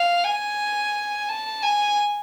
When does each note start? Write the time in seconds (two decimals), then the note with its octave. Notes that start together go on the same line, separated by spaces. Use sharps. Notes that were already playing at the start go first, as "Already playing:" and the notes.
Already playing: F5
0.25 G#5
1.29 A5
1.63 G#5